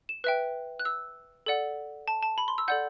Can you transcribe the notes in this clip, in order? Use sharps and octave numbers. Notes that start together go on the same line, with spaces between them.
E7
B4 E5 G5 F#6
F#6
E6
A4 D5 F#5
A5
A5
B5
C6
E6
A4 D5 F#5 G6